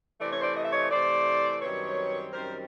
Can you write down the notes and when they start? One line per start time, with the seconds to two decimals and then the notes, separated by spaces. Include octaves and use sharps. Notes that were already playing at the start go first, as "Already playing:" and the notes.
0.20 C3 E3 A3 D5
0.30 C#5
0.41 C5 D5
0.55 D#5
0.64 E5
0.73 C#5 D#5
0.91 C3 E3 A3 C5 D5
1.62 F#2 D#3 G3 C4 B4 C#5
2.33 F#2 D#3 G3 C4 A#4 C5